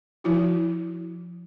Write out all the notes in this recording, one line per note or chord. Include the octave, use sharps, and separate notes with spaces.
F3 E4 F#4